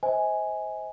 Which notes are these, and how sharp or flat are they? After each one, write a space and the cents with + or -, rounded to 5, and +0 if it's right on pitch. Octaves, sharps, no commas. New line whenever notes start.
C5 +0 D#5 +45 G#5 +0